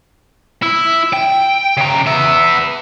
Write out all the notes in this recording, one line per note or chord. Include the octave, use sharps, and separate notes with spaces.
E4
G5
C#3 A#5
B3 E5